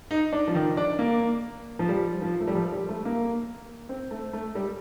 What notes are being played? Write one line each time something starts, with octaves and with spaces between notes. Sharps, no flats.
D#4
D4
F3
D#3
D4
A#3
F3
G3
F3
A3
G3
F3
G3
A3
A#3
C4
A3
A3
G3